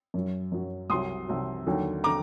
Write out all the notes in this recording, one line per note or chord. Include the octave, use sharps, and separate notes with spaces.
F#2 F#3
F#2 F#3
C2 C3 F#3 C6 D#6
C2 C3 F#3
D#2 D3 F#3
D3 A#5 D6